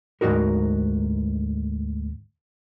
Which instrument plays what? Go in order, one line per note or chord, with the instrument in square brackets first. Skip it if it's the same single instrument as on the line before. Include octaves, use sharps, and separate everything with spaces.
[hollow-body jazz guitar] D2 G#2 C3 D#4 F#4 A#4